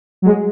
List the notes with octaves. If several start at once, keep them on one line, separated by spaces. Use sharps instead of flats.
F#3
G#3